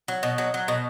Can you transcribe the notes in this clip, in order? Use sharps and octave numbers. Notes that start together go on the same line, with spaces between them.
F#3
B2
F#3
F#3
B2